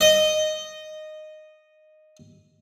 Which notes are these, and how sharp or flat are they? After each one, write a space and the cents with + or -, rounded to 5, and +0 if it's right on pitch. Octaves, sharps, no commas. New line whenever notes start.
D#5 -10